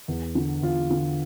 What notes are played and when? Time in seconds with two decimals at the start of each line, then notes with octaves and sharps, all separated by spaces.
0.08 E2
0.35 D3
0.62 E2 F4
0.91 D3